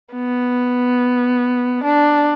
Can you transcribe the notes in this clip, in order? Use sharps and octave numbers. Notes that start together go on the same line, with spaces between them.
B3
D4